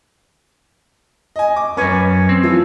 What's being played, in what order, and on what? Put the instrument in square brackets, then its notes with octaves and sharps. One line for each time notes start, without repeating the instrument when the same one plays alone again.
[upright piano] D#5 G#5
D6
[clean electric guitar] F#2 C#4 [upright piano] B4
[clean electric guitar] C4
[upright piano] E3 F3